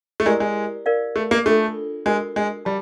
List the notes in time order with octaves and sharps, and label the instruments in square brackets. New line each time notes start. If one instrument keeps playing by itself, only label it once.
[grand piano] A3
[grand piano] G#3 [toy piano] E4 G4 A#4 D5
[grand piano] G#3
[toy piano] A#4 D5 F5
[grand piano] A3
A#3
[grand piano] A3 [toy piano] D4 F4 A4
[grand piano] G#3 [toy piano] D4 F#4 A#4
[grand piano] G#3
[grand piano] G3 [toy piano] A5